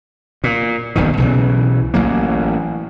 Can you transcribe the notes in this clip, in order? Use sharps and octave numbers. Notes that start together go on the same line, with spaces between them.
A#2
D#1 B1 G2 D#3
B1 C#3 E3
A1 F#3 A#3